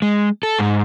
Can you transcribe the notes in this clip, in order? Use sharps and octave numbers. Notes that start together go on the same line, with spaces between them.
G#3
A4
G#2